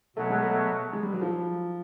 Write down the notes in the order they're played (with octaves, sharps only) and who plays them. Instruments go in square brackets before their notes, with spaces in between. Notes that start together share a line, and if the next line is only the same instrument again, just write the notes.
[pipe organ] B2 F#3 B3 [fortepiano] A3
[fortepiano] G#3
A3
G#3
G3
F#3
F3